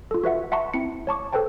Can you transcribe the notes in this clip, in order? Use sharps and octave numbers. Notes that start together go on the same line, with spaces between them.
F4 A4
F#4 B4 E5 F#5
E5 F#5 A5 A#5 C6 C#6
C4 E4 C#7
C#5 A5 C#6 D6
A4 B4 C5 G5 A5